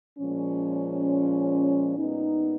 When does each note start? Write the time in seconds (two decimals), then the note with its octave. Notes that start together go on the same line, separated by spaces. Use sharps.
0.18 A#2 F3 G#3 C#4
1.97 A#2 G#3 B3 D#4